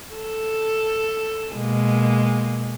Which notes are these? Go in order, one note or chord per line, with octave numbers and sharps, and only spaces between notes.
A4
B2 G#3 A#3